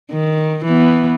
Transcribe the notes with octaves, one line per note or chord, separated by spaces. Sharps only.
D#3
E3 B3